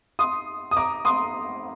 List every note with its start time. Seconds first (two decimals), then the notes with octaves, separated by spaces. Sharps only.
0.19 C6 D#6
0.71 D#6
0.77 A#5 D6
1.05 C6 D#6